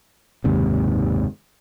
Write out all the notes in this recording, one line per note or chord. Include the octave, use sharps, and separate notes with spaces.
F#1 D#2 G#2 C3